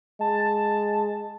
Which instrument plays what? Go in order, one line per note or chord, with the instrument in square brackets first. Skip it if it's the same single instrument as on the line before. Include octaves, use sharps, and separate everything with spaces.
[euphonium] G#3 [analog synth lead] A5